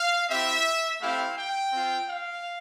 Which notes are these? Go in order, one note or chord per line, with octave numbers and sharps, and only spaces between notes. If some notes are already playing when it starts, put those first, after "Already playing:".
Already playing: F5
C4 E4 G4 E5
A3 C4 E4 G4 F5
G5
C4 F4
F5